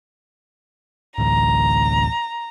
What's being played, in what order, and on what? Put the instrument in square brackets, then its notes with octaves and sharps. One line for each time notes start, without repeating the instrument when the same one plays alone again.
[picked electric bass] D1 A1 D2 [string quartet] A#5